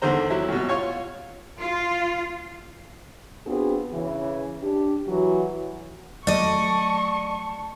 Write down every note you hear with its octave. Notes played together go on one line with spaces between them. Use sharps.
E2 D3 D#3 C5 A#5
F#3 E4
F#2 B2
F4 C#5 C#6
F4
B3 C4 D4 F4 F#4 G#4
C#3 E3
D4 G4
E3 F#3 F#4
F#3 A3 D5 D#5 A5 C#6